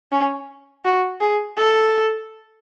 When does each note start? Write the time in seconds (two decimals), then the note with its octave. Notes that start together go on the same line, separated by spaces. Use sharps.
0.12 C#4
0.85 F#4
1.21 G#4
1.57 A4